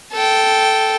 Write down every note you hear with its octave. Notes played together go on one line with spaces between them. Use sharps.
A4 G5